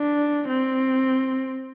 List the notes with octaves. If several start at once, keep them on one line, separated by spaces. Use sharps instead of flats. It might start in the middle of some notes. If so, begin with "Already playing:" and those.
Already playing: D4
C4